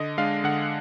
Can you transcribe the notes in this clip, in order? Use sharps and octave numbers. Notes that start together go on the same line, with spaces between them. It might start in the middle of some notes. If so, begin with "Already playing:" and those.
Already playing: D3 D#5
G#3 D4 F5
D3 F#5